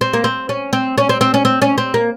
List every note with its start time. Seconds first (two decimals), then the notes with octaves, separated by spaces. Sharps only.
0.01 C4
0.13 A#3
0.24 C4
0.49 C#4
0.73 C4
0.98 C#4
1.09 C4
1.21 C4
1.34 C#4
1.45 C4
1.62 C#4
1.78 C4
1.94 A#3